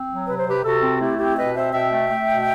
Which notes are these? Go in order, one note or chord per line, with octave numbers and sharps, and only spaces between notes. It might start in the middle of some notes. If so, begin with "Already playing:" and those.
Already playing: C4
F#3
C3 B4
C5
C3 G4 B4
C3 F#4 A4
C4
A3 E4 G4
C4 E4 G4
B2 B4 D#5
C4 C5 E5
B2 E5 G5
A3
A3
B2